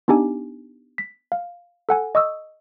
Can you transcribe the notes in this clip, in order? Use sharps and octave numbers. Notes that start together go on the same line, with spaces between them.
B3 D4 D#4 G4 G#5
B6
F5
A4 F#5 G#5
D#5 C#6 D#6 E6